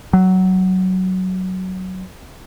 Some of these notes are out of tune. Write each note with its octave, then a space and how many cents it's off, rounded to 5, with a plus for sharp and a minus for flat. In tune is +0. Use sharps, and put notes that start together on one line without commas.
F#3 +10